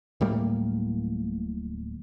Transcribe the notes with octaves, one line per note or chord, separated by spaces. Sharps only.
D1 A2 G3 A#3